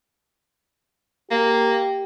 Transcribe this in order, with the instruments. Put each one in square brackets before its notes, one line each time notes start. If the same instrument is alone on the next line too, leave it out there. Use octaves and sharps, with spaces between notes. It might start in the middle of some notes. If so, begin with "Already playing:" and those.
[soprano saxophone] A#3 [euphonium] G4